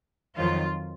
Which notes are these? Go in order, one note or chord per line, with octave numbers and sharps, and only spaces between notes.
F2 D#3 F#3 F4